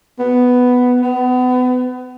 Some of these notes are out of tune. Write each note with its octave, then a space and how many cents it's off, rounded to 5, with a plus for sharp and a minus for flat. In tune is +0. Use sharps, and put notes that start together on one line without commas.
B3 +5
B3 +30